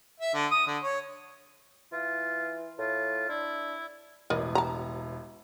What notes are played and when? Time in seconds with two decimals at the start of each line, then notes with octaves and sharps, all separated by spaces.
0.20 E5
0.34 D3
0.51 D#6
0.67 D3
0.83 C#5
1.93 E3 F4
2.79 A2 F4
3.29 D4 E4
4.30 E1 A1 A#4 D5 D#5
4.55 A5 A#5